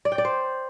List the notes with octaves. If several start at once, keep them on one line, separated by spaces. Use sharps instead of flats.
D5
G5
D5
C5